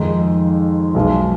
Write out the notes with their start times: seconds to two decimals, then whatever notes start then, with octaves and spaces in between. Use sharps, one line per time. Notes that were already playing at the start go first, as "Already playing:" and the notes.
Already playing: F2 D#3 G#3 D#4
0.94 B1 B2 G#3